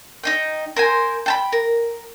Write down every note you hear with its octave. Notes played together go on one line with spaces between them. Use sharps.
D#4 D#5 G5
A#4 C5 G#5
G5 A5 B5
A#4